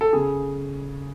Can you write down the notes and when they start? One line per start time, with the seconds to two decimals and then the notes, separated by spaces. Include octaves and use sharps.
0.01 A4
0.13 C#3 G#4